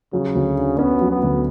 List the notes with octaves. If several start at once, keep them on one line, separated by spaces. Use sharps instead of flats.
C#3 F#3
D2
D3
B3 C#4
F#3
B3
D2